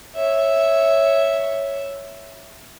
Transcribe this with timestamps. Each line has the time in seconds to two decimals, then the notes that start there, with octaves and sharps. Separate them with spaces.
0.16 C#5 E5